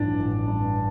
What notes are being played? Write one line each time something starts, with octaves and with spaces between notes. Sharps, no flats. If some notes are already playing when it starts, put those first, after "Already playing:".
Already playing: A1 G2 F3 D4
A1
G2